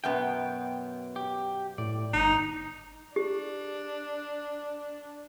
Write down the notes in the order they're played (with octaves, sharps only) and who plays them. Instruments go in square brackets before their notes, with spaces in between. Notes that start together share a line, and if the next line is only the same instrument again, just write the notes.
[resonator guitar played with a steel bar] F#2 B2 B3 [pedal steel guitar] G5
[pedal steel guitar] G4
[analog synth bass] A2 [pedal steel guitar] D5
[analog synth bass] G1 [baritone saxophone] D#4
[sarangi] D4 [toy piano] G4